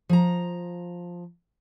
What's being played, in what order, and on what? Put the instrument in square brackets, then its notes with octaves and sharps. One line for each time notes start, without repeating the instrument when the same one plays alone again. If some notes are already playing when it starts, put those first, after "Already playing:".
[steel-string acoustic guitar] F3 A#5